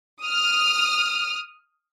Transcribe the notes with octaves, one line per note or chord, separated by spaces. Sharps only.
D#6 F6